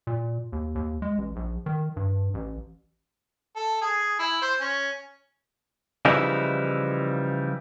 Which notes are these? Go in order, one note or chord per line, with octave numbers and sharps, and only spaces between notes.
A#2
D#2
D#2
G#3
A1
A#1
D#3
G2
A1
A4
G#4
E4
C5
C#4
C#3 E3 F3 G3 D#4 E4